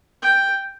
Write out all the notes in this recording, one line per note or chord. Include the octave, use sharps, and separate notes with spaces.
G5